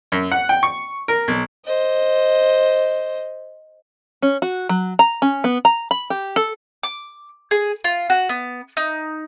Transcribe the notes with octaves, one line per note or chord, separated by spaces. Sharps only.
F#2
F#5
G5
C#6
A#4
B1
C5 D#5
C#4
F#4
F#3
A#5
C#4
B3
A#5
B5
G4
A4
D6
G#4
F4
F#4
B3
D#4